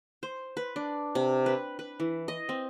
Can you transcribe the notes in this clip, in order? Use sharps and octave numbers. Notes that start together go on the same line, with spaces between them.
C5
B4
D4
C3
B4
B4
E3
D#5
C4